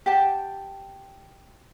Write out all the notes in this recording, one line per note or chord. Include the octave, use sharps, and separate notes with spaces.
G4 F#5 G5 A5